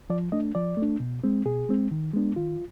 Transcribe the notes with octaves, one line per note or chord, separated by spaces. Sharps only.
F3 D5
A3 D4 D#5
F3 D5
A3
D4
B2
G#3 C4
B2 G#4
G#3 C4
D#3
G#3 B3 D4
D#3 F4